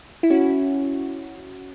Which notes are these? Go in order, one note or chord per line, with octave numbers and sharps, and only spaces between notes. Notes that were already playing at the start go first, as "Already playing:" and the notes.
E4
C#4 F#4